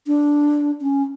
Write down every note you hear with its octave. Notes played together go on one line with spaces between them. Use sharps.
D4
C#4